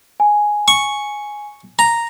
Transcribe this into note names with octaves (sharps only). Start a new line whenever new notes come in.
G#5
C#6
A#5